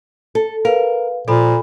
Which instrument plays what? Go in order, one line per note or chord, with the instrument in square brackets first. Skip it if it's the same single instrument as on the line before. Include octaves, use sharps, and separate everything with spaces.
[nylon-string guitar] A4
[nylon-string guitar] A#4 [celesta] B4 F5
[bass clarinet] A#2 [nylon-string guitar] F3 [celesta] A4 B5